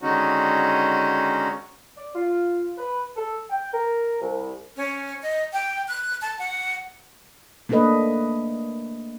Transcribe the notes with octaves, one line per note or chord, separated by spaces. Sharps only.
D3 D#3 G#3 C#4 D#4 F#4
D5
F4
B4
A4
G5
A#4
C2
C#4
D#5
G5
F#6
A5
F#5
A3 A#3 D4 A4 B4 D#5